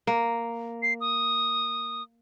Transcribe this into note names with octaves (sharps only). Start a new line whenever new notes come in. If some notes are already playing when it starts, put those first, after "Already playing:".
A#3
C7
D#6